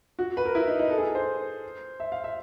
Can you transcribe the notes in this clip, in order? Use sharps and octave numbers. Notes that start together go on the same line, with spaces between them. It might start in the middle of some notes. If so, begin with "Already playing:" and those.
F#4
B4
A#4
E4
D#4
D#4
A4
G#4
A4
C5
E5
F5
E5